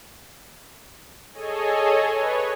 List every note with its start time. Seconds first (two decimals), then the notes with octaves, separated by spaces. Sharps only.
1.33 G#4 A4 C#5 D#5 G#5
2.12 B4 C#5